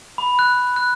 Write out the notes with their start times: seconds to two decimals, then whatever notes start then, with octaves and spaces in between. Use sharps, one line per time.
0.18 B5
0.39 F#6
0.76 F#6